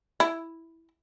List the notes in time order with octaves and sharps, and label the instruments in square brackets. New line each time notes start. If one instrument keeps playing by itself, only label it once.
[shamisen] E4